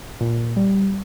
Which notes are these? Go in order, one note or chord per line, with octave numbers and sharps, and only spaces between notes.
A#2
G3